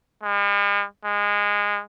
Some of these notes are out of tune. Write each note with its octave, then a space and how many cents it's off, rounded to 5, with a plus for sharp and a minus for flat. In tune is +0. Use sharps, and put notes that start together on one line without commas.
G#3 -45
G#3 -20